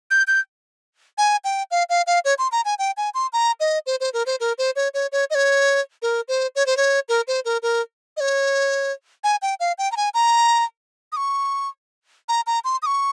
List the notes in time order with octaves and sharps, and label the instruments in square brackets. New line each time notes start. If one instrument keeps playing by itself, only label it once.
[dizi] G6
G6
G#5
G5
F5
F5
F5
C#5
C6
A#5
G#5
G5
G#5
C6
A#5
D#5
C5
C5
A#4
C5
A#4
C5
C#5
C#5
C#5
D#5
C#5
A#4
C5
C#5
C5
C#5
A#4
C5
A#4
A#4
D#5
C#5
G#5
G5
F5
G5
A#5
G#5
A#5
D#6
C#6
A#5
A#5
C6
D#6
C#6